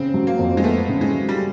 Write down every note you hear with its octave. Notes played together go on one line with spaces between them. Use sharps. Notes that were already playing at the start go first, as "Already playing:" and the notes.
Already playing: C#3 C4
F#3
A#3
F2
G#3
A3 B3
C#3
G#3
F#3
G3